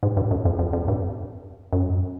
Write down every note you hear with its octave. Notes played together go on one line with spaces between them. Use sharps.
G#2
G2
F#2
F2
F2
F2
G2
F#2